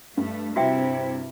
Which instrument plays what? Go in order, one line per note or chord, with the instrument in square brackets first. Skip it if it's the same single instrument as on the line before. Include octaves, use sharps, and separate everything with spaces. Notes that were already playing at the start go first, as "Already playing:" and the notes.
[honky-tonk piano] G2 [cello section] A3
[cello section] C3 E4 [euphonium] C4 [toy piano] F#4 E5 G5